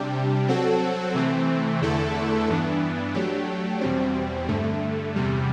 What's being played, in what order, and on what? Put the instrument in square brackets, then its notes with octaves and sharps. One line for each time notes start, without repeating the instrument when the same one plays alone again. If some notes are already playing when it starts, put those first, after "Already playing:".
Already playing: [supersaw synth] C3 G3 D4 G4
F#3 C4 F#4 A4
C3 E3 A3 C4
E2 D3 A3 E4 A4
G2 E3 B3 D4
F#3 A3 D4 G4
E2 B2 G3 C4
G2 D3 A3
E2 C3 G3